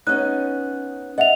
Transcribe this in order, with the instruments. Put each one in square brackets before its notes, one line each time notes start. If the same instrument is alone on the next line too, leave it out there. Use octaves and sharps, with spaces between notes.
[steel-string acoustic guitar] B3 C#4 D#4 [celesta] F#6
[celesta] D#5 E5 F7 [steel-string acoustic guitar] F#5